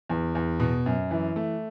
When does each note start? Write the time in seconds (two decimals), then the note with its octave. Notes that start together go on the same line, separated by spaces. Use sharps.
0.09 E2
0.35 E2
0.60 B2
0.86 F#2
1.11 E3
1.36 A3